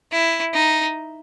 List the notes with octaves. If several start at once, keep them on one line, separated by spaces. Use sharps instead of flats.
E4
D#4